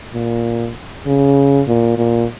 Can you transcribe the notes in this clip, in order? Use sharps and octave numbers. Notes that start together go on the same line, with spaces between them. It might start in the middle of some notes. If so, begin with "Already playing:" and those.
A#2
C#3
A#2
A#2